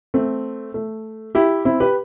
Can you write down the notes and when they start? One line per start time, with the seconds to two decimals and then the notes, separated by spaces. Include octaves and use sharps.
0.14 A3 C4
0.74 A3
1.35 E4 G4
1.65 C4 E4
1.80 G4 B4